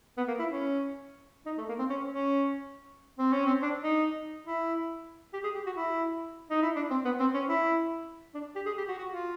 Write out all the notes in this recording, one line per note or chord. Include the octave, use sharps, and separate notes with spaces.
B3
A#3
E4
C#4
D#4
A3
A#3
C4
C#4
C#4
C4
C#4
C4
D4
D#4
E4
G4
G#4
G4
F#4
E4
D#4
E4
D4
C4
B3
C4
C#4
E4
D4
G4
G#4
G4
F#4
F#4
F4